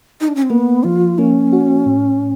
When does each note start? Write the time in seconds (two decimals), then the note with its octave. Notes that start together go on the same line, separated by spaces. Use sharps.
0.21 D#4
0.28 D4
0.36 C#4
0.43 C4
0.50 A#3 B3
0.84 F3 F4
1.18 A#3 C#4
1.53 F#4
1.86 A2